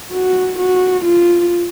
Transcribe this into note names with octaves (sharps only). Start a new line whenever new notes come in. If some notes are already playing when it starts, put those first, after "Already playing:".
F#4
F#4
F4